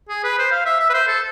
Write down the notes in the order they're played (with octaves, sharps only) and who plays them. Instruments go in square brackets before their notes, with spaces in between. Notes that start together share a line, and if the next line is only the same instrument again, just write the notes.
[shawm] G#4
B4
C5
F5
E5
E5
B4
C5
A4